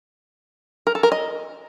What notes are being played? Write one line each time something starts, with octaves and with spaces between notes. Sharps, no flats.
A#4
A4
A#4
D#5